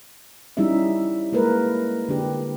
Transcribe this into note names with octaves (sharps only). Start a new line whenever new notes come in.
G3 C#4 D#4 E4 E5
G#3 A#3 A#4 B4
D3 D4 G4 B4